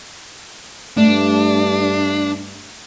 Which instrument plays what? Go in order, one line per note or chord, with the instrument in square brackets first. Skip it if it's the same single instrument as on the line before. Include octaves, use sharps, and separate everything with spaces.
[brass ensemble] G2 [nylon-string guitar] A3 [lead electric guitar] D4